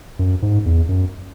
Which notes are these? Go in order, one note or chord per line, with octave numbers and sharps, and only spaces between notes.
F#2
G#2
E2
F#2